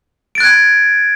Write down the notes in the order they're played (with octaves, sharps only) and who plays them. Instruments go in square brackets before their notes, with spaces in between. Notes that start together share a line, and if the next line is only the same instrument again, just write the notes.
[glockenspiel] D7
A6
F#6
G#6